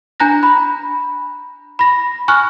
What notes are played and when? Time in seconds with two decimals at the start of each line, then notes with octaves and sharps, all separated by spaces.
0.20 D4 G#5 A#5 F#6 A#6
0.43 B5
1.79 B5 A#6
2.28 G#5 C#6 F6 F#6